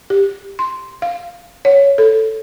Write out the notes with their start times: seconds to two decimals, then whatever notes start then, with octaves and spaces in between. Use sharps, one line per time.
0.10 G4
0.59 C6
1.02 F5
1.65 C#5
1.98 A4